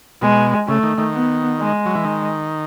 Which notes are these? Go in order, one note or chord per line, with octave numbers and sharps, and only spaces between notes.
B2 G#3
C#3 A3
D#3
D#3
B3
G#3
F#3
E3
D#3